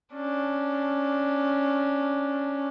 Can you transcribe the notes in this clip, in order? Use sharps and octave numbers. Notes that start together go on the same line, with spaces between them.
C#4 D4